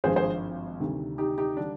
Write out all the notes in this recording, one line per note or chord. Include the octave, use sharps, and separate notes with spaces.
G#1 G2 F3 G#4 C5
G#4 C5
D2 C3 D#3 G3
D#4 G4
D#4 G4
D3 G3 D4